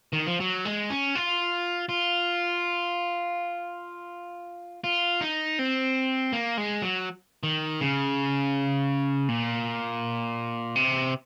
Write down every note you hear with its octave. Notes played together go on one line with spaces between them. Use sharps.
D#3
F3
F#3
G#3
C#4
F4
F4
F4
D#4
C4
A#3
G#3
F#3
D#3
C#3
A#2
C3